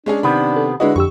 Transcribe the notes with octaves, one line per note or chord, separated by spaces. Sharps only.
G#3 C#4 D4 G#4
C3 D#3 B3 B5
A4
D3 G#3 D4 E4 F#4 B4 D#5
F2 G4 C#6 E6